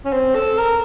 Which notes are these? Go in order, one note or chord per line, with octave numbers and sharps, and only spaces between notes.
C#4
C4
A4
A#4